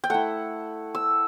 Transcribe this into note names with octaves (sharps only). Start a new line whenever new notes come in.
G5
A3 E4 F#5
E6